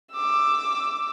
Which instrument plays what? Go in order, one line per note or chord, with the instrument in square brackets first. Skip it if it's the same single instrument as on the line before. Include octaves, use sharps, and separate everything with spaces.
[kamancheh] D6 E6